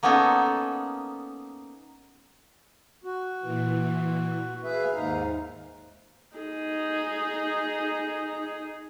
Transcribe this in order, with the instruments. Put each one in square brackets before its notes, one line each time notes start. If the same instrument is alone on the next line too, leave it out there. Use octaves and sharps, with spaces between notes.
[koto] A#3 B3 C#4 D#4 A4
[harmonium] F#4
[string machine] A#2 E3
[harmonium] G#4 B4 E5 [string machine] F5
[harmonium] D#2 G#2 D#4
[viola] D#4 G#4